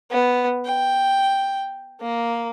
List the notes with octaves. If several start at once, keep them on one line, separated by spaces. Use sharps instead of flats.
B3
G5
A#3